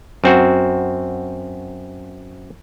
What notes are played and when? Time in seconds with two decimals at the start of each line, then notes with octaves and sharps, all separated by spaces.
0.24 F#2 C4 F#4